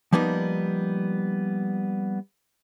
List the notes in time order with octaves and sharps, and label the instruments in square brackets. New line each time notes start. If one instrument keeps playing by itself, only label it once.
[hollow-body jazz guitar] F3 G3 A#3 B3 D#4